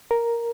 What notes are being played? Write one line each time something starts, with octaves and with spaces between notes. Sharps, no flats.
A#4